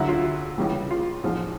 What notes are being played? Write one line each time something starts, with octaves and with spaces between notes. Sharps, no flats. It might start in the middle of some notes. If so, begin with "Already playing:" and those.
Already playing: D2 D3 F#3 E4
F4
C#2 C#3 E3 G3
F4
A1 G#2 F3